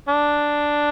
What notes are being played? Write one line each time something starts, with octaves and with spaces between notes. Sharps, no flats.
D4